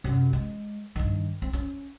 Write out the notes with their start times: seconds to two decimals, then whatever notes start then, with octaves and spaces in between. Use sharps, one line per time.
0.04 F#2 C3
0.33 G#3
0.96 G2 D#3
1.42 C4
1.53 C#4